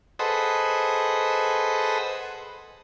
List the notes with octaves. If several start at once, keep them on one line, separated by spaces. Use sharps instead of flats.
G#4 A4 B4 C5 D#5 F#5